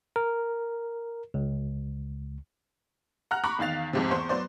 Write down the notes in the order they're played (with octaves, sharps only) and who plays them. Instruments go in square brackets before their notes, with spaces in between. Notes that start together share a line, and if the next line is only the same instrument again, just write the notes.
[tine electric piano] A#4
C#2
[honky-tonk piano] F#5 A#5 F6 F#6
A#5 B5 C#6 D6 F#6
E2 D#3 F5 A6 F7
F2 G#2 C3
E2 C5 C#6
F#3 B3 C5 D5